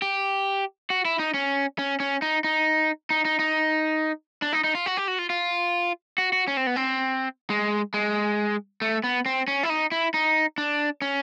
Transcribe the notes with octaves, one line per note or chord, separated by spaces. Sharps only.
G4
F#4
E4
D#4
C#4
C#4
C#4
D#4
D#4
D#4
D#4
D#4
D4
D#4
D#4
F4
F#4
G4
F#4
F4
F4
F#4
F#4
C#4
C4
B3
C4
G#3
G#3
A3
B3
C4
C#4
E4
D#4
E4
D#4
D4
C#4